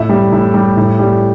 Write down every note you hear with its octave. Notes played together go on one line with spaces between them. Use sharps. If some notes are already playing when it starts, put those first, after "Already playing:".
Already playing: A2 E5
G3
A2
G3
A2
G3